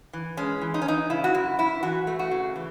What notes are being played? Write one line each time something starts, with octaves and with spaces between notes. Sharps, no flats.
E3
G#3 C#4
E3
D#4
C#4
E3 D#4
C#3 E4
F#4
F#2 E4
F#2 E4
E3 F#4
A3
F#4
C#3
E3